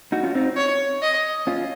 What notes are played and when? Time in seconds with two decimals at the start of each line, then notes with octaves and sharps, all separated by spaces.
0.12 D#4 F#4
0.23 C#4 F4
0.35 C4 D#4
0.57 C#5
1.03 D#5
1.47 C#4 F4